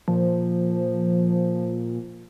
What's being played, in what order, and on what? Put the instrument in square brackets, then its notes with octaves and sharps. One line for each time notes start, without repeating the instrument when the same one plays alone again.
[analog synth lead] A#2 [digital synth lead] F3